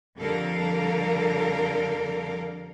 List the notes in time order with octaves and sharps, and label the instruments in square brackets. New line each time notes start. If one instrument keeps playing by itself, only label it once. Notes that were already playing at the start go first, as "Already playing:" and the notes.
[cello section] F2 D3 G3 A4 A#4 F5